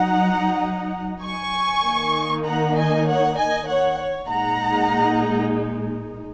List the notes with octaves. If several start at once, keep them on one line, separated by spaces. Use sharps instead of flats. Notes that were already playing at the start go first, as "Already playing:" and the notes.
Already playing: F#3 D#4 F#5 A#5
G#5 C#6
D#3 A#3 D#4
F#5 A#5
D#5 G#5
C#5 F#5
D#5 G#5
C#5 F#5
C#5
A#2 G#3 D#4 F#5 A#5